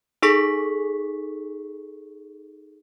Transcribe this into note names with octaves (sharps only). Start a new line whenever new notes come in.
D#4 G#4 A4 C#6 B6